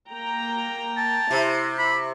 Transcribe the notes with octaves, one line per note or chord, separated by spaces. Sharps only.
A#3 G5 A#5
A5
C3 E4 C5
E4 B5